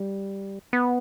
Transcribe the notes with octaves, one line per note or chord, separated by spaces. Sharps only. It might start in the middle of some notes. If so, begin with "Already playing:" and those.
Already playing: G3
B3